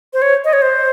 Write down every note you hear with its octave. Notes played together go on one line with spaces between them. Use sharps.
C5
C#5
D#5
C#5
C5